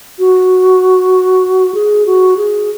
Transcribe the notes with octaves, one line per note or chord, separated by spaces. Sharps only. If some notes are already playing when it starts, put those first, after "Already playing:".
F#4
G#4
F#4
G#4